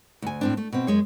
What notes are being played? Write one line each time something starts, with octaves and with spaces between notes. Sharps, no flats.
D2 G#5
A2 C4 D4
A3
B2 C4
F#2 G#3 C#5